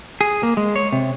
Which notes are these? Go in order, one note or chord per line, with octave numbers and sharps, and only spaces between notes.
G#4
A#3
G#3
C#5
C3